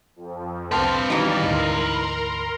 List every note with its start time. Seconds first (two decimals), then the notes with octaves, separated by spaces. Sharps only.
0.16 F2
0.72 C2 C4 B4 F5 A5 C6
1.10 D#3 E3 G3 C#4 D#4 F#4 D5
1.42 D2 G#2 A#4 A#5 C6